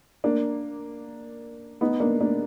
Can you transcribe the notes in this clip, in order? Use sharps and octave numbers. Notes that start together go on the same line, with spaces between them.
A#3 D4
B3 D#4
A#3 D4
A#3 D4